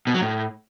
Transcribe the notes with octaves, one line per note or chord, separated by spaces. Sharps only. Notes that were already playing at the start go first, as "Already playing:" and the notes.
B2
F#3
A2